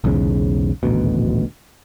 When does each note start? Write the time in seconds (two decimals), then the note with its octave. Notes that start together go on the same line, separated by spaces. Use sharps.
0.04 B1 E2 G#2 C#3
0.83 D#1 A1 D2 B2